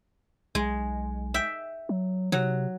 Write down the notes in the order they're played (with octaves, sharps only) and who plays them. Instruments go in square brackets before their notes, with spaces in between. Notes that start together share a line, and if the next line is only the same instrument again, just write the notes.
[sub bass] B1 [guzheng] G#3
[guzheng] E5 G5
[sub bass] F#3
[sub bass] C3 [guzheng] F#3